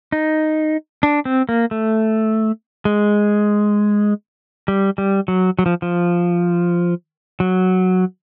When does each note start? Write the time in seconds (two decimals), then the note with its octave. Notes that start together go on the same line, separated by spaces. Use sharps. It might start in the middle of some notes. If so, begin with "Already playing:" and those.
0.12 D#4
1.03 D4
1.25 C4
1.49 A#3
1.71 A3
2.85 G#3
4.68 G3
4.98 G3
5.28 F#3
5.59 F#3
5.66 F3
5.82 F3
7.40 F#3